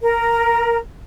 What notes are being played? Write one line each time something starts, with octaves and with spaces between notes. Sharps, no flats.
A#4